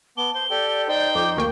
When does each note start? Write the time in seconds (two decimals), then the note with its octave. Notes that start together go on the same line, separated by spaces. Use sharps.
0.17 B3 A5 D6 G7
0.35 C5 G7
0.50 G4 A4 D5 G5
0.88 D#4 C5 D5 G5
1.15 F2 D6
1.37 D2 A#3 G5 C#6